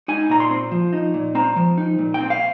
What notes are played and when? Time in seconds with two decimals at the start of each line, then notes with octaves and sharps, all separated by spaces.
0.08 D#4 G#5
0.29 A#2 A#5
0.40 C6
0.51 C4
0.71 F3
0.93 D#4
1.14 A#2
1.35 C4 A#5
1.56 F3
1.78 D#4
1.98 A#2
2.14 G5
2.20 C4
2.30 F5